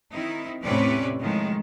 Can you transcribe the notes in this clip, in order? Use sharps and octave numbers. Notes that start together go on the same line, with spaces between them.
D#3 C4 D#4 E4
E2 A2 C3 C#4 B4 D5
A2 D#3 F3 G#3